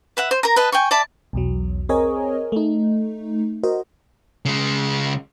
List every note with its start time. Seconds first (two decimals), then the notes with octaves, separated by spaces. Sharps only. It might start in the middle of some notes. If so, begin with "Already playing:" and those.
0.17 B4 E5 F#5
0.31 C5
0.43 A#4 A#5
0.56 B4 D#5 A5
0.72 G5 G#5 C#6
0.91 D5 E5 A5 B5
1.33 B1 E2 F#3
1.89 C4 G#4 A#4 C#5 D#5 G#5
2.52 A3 D#4
3.63 F#4 A#4 C5 D#5
4.45 C#3 G#3